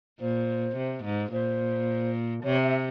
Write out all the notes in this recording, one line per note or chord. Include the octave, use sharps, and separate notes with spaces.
A#2 C5
C3
G#2
A#2 C5
C3 C#5
E5